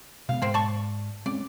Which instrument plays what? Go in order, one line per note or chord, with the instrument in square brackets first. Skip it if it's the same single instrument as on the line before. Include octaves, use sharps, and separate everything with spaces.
[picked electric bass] B2 G#3 B3 [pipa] F5
[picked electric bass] G#2 G#3 [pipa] A#3 C4
[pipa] D5 A5 C#6
[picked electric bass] G#3 C4 C#4 [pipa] D5